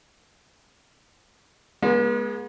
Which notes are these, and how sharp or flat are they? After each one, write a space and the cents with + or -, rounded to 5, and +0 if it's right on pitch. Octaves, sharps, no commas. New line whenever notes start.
G#3 +0 B3 -45